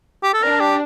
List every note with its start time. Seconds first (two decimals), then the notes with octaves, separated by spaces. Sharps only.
0.23 G4
0.33 A4
0.43 D4 A#4
0.60 G4